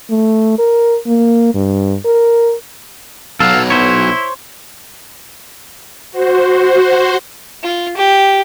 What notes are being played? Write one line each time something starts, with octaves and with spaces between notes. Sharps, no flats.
A3
A#4
A#3
G2
A#4
B1 F#3 A4 F5
E4 C5 C#5
F#4 C5
F4
G4